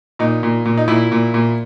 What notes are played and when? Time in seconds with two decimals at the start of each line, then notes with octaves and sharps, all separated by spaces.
0.19 A#2 D#4
0.43 A#2
0.65 A#2
0.78 D#4
0.88 A#2 E4
1.12 A#2
1.34 A#2